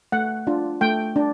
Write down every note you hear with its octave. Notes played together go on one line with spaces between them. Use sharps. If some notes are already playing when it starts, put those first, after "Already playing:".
A3 F#5
D4 F4
A3 G5
D4